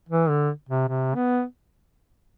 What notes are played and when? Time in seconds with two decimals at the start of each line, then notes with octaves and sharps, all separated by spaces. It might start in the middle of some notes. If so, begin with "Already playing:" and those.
0.09 E3
0.29 D3
0.69 C3
0.88 C3
1.15 B3